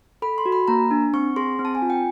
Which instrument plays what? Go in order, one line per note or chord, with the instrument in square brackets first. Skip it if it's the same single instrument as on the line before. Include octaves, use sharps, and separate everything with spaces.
[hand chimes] A4 B5
C6
F#4
B5
A#3 A#5
D4
C4 C#6
G#4 C6
C4
A5
G#5
F4
G5